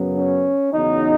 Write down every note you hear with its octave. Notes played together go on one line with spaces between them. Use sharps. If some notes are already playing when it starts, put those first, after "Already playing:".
Already playing: F#2 C#3 F#3 B3
C#4
E2 C#3 F#3 D#4